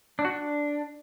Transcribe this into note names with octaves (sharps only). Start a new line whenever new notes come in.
D4
F#4
D4